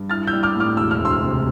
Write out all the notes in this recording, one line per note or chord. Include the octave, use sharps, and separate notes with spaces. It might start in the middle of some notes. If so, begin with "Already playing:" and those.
Already playing: G2
E4 F6 A6
E6 G6
G3
D6 F6
A2
D6 F6
E1 E6
F6
D2
C6 E6
C3